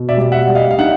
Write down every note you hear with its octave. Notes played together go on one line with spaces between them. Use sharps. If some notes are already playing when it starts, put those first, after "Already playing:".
Already playing: B2
D5 E5
G3
E5 F#5
G3
D#5 F5
F5
D#4 E5 F#5